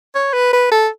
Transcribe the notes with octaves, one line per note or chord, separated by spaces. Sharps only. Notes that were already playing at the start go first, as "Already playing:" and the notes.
C#5
B4
B4
A4